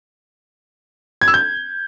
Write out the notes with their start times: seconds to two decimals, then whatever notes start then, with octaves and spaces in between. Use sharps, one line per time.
1.22 G#6
1.28 E6
1.34 G6